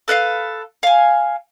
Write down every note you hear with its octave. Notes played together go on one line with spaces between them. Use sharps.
A4 B4 D#5 F5
F5 G#5